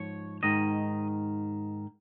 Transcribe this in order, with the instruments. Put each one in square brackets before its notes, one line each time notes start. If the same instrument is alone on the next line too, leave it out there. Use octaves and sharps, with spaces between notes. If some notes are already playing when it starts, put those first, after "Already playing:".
Already playing: [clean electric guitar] G#2 F3 C#5
G#2 D#3 D#5